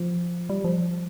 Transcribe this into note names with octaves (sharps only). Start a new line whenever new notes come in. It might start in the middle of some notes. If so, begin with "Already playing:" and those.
Already playing: F3
G3
F3